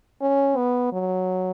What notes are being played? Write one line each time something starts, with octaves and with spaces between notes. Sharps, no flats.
C#4
B3
F#3